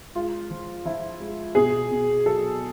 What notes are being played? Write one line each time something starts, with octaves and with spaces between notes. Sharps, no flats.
G#3 F4
F3
F3 E4
G#3
B2 G#4
B2
F#3 A4